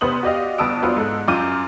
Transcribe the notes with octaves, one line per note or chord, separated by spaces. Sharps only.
F1 B3 B4 C5 D#6 F#7
F#4 G4 D5 D#5 F5
G1 B3 A5 D#6 E6 D7
F#3 B3 D4 F4 C5 D5
G#2 A4 F#6
F#2 F4 D6 G6 D#7